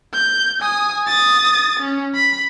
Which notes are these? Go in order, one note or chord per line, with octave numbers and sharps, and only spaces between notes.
G6
G#5 D#6
D#6 A6
C#4
B5